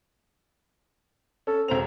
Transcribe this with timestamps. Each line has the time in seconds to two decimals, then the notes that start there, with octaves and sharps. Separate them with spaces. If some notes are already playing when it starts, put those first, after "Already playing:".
1.47 C#4 A4
1.68 E1 C4 A#5 F7